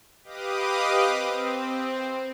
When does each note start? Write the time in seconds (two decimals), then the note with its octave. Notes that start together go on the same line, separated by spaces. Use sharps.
0.24 G4 B4 D#5 F5 D6 D#6
1.05 C4